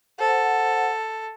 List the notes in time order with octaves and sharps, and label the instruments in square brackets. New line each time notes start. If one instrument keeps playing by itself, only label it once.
[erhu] A4 [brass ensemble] C5 F#5